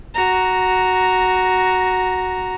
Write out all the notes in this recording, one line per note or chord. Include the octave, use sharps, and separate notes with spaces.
F#4 A#5